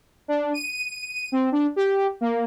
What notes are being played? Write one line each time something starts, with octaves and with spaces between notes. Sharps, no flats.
D4
D#7
C4
D4
G4
A#3